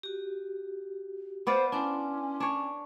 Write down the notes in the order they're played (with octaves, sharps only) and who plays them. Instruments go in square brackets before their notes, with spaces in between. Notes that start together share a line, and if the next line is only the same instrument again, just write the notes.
[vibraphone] F#4 G4
[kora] B3 D5 F5 [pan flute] C5
[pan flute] C#4 [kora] D4 [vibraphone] E4 C6 D6
[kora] D4 C#5